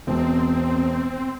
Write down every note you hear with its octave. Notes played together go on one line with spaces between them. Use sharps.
E1 C4